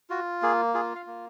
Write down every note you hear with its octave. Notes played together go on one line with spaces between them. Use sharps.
F4 F#4
A#3 G#4
F4 G#4
F5
A#3